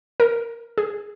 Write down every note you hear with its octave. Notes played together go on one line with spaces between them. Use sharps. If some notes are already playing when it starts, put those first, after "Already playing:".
A#4
G#4